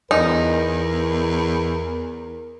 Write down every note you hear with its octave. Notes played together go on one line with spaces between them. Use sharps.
E2 D#4 A#4